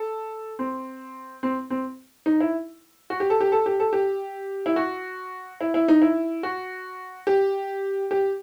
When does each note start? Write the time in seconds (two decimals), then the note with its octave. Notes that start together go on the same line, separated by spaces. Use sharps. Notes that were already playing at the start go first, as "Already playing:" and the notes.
Already playing: A4
0.59 C4
1.43 C4
1.70 C4
2.26 D#4
2.41 E4
3.10 F#4
3.20 G4
3.30 A4
3.41 G4
3.52 A4
3.66 G4
3.80 A4
3.93 G4
4.66 E4
4.76 F#4
5.61 E4
5.74 E4
5.88 D#4
6.02 E4
6.43 F#4
7.27 G4
8.11 G4